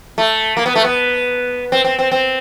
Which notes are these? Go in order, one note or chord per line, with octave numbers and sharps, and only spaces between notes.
A3
A#3
B3
A3
B3
C4
C4
C4
C4